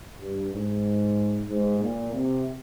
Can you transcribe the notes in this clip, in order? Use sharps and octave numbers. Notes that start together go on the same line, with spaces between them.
G2
G#2
G#2
A#2
C3